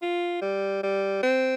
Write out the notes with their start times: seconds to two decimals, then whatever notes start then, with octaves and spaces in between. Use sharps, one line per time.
0.02 F4
0.42 G3
0.83 G3
1.23 C4